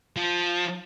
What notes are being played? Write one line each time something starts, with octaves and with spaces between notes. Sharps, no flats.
F3